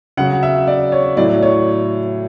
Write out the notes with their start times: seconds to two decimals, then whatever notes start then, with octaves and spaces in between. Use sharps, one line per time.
0.17 C#3 F#3 F#5
0.43 E5
0.67 D5
0.92 C#5
1.17 A2 F#3 D5
1.43 C#5